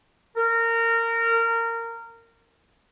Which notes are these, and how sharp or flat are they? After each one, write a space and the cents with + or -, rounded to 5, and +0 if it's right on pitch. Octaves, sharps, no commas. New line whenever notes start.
A#4 -20